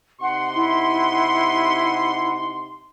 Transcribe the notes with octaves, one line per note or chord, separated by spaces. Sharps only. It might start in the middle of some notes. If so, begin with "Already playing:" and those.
C3 D#4 F#5 C6
E4 F#5